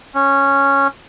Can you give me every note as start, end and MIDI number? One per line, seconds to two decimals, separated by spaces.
0.15 0.88 61